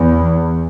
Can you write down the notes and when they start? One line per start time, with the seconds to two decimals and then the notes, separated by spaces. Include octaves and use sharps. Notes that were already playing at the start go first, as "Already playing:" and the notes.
Already playing: E2